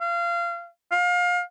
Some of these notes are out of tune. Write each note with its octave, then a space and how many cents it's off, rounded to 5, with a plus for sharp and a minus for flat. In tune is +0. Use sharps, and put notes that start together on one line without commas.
F5 -25
F5 +30